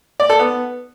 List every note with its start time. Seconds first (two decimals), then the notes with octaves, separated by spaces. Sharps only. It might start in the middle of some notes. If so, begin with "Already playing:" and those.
0.20 D5
0.30 A4
0.40 B3